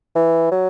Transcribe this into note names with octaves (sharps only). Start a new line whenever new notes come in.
E3
F#3